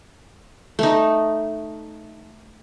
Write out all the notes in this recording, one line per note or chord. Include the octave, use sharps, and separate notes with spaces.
A3 D#4